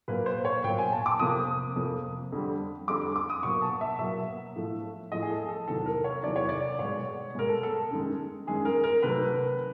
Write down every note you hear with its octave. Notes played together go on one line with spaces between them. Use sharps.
A#2 F#3 A#3 B4
C5
C#5
A#2 F#3 A#3 G5
G#5
A5
D6
F2 C3 F3 A#3 D#6
F2 C3 F3 A#3
F2 D3 G3
F2 D3 G3 D6
D6
D#6
B2 F#3 A#3 C#6
A5
E5
B2 F#3 A#3 E5
A2 F3 A3
A2 F3 A3 D#5
G#4
A4
A4
E2 C3 D#3 F#3 A4
A#4
C#5
E2 C3 D#3 F#3 D5
C#5
D5
B2 G#3 C#5
B2 G#3 A#4
A4
A4
F#2 D#3 G#3
F#2 D#3 G#3 G#4
A#4
A#4
C3 D#3 F#3 A3 B4